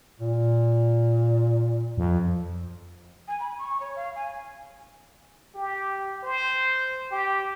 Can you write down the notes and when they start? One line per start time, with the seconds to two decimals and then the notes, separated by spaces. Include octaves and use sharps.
0.20 A#2
1.98 F2
3.27 G#5
3.39 B5
3.58 C#6
3.79 C#5
3.95 F5
4.15 G#5
5.55 G4
6.23 C5
7.11 G4